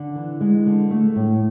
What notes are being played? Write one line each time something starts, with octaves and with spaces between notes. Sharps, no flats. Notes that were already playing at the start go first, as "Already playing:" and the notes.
Already playing: D3
E3
G#3
D3
A3
A2